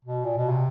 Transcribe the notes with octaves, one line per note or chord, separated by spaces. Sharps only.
B2
A#2
B2
C3